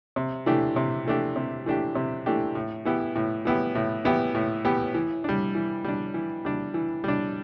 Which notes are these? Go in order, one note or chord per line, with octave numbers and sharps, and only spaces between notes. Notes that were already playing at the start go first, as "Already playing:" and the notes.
C3
E3 A3 D4 G4
C3
E3 A3 D4 G4
C3
E3 A3 D4 G4
C3
E3 A3 D4 G4
A2
E3 B3 E4 G4
A2
E3 B3 E4 G4
A2
E3 B3 E4 G4
A2
E3 B3 E4 G4
E3
G3 D4
E3
G3 D4
E3
G3 D4
E3
G3 D4